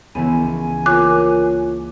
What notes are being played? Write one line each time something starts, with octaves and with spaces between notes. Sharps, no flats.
C#2 E3 B3 E4 G#5
A#3 C#4 F4 C#5 D6 F#6